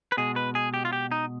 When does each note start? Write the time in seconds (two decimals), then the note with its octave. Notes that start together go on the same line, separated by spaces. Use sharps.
0.12 B4
0.17 B2 G#3 G#4
0.36 B4
0.55 G#4
0.74 G4
0.85 F4
0.93 G4
1.11 D#4